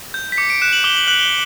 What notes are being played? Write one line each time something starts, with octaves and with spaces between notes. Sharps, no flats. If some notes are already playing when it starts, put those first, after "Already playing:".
G6
B6
D6 C#7
D7
F#6 E7
F#7
D6 G7
F#7
F#6 F#7
G7